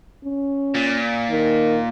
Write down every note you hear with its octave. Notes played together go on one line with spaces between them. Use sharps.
C#4
A#2
D#3